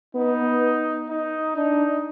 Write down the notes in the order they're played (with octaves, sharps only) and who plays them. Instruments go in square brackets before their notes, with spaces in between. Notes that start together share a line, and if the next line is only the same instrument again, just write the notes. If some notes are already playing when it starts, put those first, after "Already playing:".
[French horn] B3 [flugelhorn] D#4
[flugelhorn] D#4
[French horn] D4 [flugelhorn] D#4